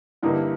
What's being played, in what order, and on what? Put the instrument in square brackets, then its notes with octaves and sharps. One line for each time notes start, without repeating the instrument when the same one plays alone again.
[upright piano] G2 D3 G3 A#3 D#4 [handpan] E4